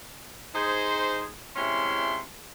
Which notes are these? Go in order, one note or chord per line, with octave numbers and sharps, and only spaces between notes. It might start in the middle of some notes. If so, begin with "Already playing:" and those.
D#4 G#4 C5
C3 G#3 C#4 E4 E5 C6